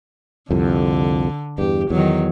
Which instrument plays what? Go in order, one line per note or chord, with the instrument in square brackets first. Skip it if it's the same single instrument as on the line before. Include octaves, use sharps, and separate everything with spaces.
[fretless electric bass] C2 F2 [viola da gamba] D3
[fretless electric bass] E2 G2 [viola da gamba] G4
[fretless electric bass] E2 [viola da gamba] D#3 F#3